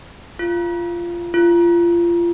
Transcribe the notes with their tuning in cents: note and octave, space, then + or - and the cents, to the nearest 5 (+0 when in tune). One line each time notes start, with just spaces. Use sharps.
F4 -15
F4 -25